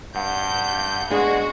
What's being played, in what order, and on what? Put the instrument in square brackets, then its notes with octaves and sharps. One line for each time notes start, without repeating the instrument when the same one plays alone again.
[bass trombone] G2 [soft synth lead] F#5 [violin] G6
[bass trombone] G#3 [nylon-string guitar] B3 D4 G#4 [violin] F#4